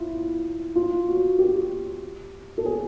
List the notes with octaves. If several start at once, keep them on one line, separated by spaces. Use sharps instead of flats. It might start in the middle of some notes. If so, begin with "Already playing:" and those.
Already playing: E4 F4
F4
F#4
G4
A4
G#4